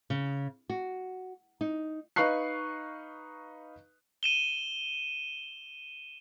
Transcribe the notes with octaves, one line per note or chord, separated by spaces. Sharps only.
C#3
F#4
D#4
D#4 B4 F5 C#6 F#6 C7
D#7 E7 G7